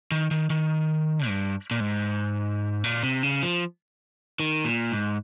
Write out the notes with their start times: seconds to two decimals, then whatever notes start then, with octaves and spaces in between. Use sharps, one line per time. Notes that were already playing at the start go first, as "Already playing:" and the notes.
0.12 D#3
0.31 D#3
0.50 D#3
1.28 G2
1.71 A#2
1.80 G#2
2.84 A#2
3.03 C3
3.23 C#3
3.43 F3
4.40 D#3
4.65 A#2
4.92 G#2